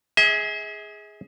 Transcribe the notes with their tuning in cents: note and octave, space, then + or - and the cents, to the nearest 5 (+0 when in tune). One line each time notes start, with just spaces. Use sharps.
G#4 +0 E5 -45